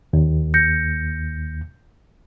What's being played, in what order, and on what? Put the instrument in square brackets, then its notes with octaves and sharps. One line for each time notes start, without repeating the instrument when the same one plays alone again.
[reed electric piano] D#2
[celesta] G6 A#6 C#7